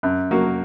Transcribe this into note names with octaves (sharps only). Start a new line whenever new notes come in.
F#2
F#3 A#3 F#4